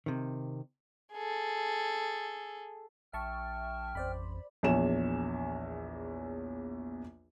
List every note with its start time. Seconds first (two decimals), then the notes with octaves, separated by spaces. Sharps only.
0.06 C3 D#3
1.13 G#4 A4
3.13 A#1 E5 G5 A5 C#6 F6
3.95 A1 F2 C5 D5 B5
4.63 A#1 E2 C#5 E7